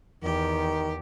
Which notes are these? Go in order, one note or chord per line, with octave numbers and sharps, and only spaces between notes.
E2 D#3 G4